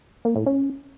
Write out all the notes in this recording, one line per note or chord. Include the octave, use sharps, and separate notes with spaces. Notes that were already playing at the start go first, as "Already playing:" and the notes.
A#3
A2
C#4